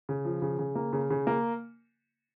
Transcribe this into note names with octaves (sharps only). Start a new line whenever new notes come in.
C#3
F3
C#3
C#3
A#3
C#3
C#3
A#3